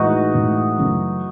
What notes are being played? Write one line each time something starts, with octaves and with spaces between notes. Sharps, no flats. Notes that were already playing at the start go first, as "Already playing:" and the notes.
Already playing: A2 E3 G#3 D#4 F#4
A2 E3 G#3
F#2 C#3 E3 A3